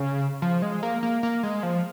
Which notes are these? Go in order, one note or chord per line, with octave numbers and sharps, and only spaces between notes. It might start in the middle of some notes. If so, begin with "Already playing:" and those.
Already playing: C#3
F3
G#3
A#3
A#3
A#3
G#3
F3